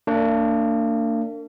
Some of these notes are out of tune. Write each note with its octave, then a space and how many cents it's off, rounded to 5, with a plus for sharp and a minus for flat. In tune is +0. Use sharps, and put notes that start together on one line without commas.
A#3 -40 D4 +0